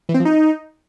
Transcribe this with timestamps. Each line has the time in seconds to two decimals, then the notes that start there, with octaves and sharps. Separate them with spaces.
0.09 E3
0.14 C4
0.20 F3
0.25 D#4